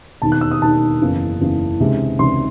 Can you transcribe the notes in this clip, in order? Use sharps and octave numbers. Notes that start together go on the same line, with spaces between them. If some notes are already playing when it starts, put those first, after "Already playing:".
E1 D#2 D#3 A5
F#6
E6
D#6
E1 D#2 D#3 A5
F#1 E2 C#3 E3
F#1 E2 C#3 E3
C#2 C3 D#3 G#3
C#2 C3 D#3 G#3 C6